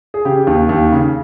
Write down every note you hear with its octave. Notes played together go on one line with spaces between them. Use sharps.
G#4
C#3 G4
D#2
D#2
C#3